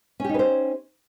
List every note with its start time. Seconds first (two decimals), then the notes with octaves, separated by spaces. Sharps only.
0.20 C#4
0.24 G4
0.29 D#4
0.34 B4
0.39 C5